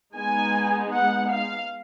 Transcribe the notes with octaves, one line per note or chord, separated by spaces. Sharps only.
G#3 B3 D#4 G#5
F#5
F5